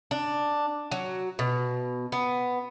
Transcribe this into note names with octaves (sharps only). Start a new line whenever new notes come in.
D4
F#3
B2
B3